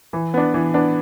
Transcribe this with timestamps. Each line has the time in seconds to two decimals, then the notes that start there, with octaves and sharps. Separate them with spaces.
0.13 E3
0.34 B3 D4
0.54 E3
0.74 B3 D4